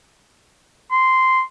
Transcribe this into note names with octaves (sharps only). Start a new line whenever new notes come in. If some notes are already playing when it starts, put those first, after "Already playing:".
C6